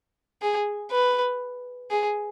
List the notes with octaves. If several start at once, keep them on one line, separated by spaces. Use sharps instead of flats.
G#4
B4
G#4